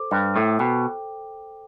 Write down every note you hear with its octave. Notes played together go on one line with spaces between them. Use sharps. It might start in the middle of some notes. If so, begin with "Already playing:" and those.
Already playing: A4 C5 D6
G2 G5
A2 A4
B2 G5